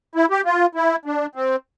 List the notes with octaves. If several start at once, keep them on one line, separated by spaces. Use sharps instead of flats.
E4
G4
F4
E4
D4
C4